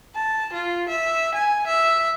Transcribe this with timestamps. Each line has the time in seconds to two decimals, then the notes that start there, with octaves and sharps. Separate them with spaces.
0.15 A5
0.53 F4
0.89 E5
1.34 G#5
1.67 E5